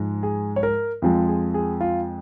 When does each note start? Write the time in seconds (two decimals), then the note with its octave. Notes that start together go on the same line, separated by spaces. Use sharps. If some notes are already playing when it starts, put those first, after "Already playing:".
Already playing: G#2 F3 G#3
0.23 G#4
0.56 C#5
0.63 A#4
1.02 F2 F3 G#3 F4
1.29 G#4
1.54 G#4
1.81 F4